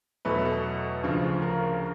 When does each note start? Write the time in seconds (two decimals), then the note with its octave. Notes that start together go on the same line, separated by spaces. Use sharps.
0.25 E2 B2 F#3 A3 B4
0.45 A4
1.03 D2 C#3 F3
1.42 A#4